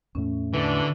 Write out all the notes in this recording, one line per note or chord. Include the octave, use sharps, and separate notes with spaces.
E2 A2 A3 C#4
B2 D3 E3 D4